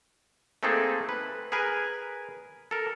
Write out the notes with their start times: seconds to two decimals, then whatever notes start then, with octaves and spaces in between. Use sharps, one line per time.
0.63 A3 A#3 C4 D#4 G#4 A4
1.09 B4
1.52 G#4 A#4 B4 G#5
2.71 A4 A#4